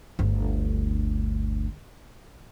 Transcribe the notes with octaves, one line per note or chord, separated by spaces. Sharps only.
G1 D2